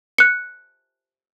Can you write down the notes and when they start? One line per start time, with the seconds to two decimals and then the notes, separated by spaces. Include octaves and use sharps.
0.18 F#6 C#7